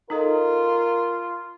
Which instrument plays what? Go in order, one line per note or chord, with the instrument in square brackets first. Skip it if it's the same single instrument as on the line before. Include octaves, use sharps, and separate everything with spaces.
[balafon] D#4 A4 D#5 [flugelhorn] F4 [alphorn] A#4